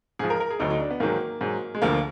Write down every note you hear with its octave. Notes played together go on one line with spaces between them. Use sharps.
G#2 F3 G#4
A#4
A#4
G#4
D2 D3 F#3 D#4
D#4
D4
B3
G#2 D#3 F#3 A#3
G#2 F#3
G#3
D2 D3 F3 A#3